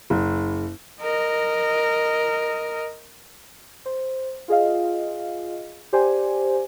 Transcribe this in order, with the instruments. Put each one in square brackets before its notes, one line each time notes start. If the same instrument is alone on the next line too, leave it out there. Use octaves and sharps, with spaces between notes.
[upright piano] F#1
[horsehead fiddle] A#4 D#5
[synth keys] C5
F4 G#4 D#5 F5
G4 C5 D5 G#5